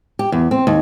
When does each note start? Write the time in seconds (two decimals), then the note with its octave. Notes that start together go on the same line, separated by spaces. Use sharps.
0.19 G4
0.32 E2
0.51 C4
0.67 D#2